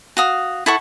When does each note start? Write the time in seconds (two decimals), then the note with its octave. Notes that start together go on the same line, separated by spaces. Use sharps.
0.17 F#4 F5 D#6
0.66 E4 A4 F#5 C#6